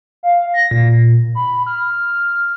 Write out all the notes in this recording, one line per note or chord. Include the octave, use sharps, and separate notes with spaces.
F5
A#6
A#2
B5
F6